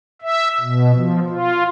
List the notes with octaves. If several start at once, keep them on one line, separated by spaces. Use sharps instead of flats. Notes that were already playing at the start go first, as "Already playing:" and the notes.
E5
B2
F3
F4